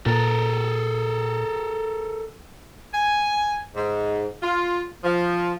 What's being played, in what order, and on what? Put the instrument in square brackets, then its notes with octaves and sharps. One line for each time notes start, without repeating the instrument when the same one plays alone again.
[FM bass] A#2 [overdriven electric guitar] A4 A#4
[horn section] G#5
G#2
F4
F3